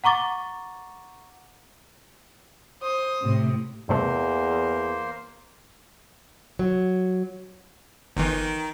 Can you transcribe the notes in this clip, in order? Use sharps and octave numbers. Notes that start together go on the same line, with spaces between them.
F#5 A#5 C#6 D6 A6
C5 D#6
A2 C3
E2 G2 C3 A3 A#3 C5
F#3
G1 D#3 E3